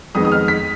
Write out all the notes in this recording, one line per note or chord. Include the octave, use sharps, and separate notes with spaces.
F2 D#3 G#3 B3 D#4 D#6
D#6
F6
B6